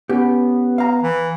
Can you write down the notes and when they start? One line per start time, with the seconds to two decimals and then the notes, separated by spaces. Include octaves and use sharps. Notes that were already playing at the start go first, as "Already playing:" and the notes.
0.09 B3 C#4 G4
0.78 F5 A#5
1.03 E3